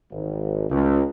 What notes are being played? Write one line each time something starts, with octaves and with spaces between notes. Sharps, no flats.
G#1
C#2